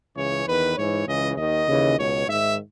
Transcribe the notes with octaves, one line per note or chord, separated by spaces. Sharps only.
C#2 C#3 E3 C#5
E2 D#3 B4
G#2 E3 C#5
C#2 C#3 E3 D#5
D#2 D#3 D#5
D#2 C#3 E3
C#2 B2 C#5
G#2 D#3 E5